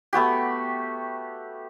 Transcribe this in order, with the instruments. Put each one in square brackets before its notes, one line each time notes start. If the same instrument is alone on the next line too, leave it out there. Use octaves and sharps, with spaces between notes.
[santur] A3 B3 F#4 G4